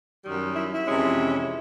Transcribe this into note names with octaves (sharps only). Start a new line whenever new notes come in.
F#2 D#3 G3
E4
E4
F2 C3 E3 G#3 C#4